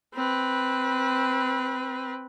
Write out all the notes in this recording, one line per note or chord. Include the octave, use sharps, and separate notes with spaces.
C4 B4